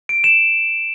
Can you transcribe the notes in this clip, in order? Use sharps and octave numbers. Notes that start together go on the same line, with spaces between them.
D7
E7